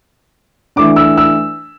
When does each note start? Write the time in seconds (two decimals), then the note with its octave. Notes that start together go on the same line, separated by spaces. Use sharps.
0.76 E3 A3 D4 D6
0.96 E6
1.17 E6